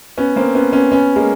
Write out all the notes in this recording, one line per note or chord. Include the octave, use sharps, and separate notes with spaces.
B3 C#4
A#3 C4
B3 C#4
B3 C#4
B3 C#4
G#3 A#3